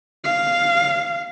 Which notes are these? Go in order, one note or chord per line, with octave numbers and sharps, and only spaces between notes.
F5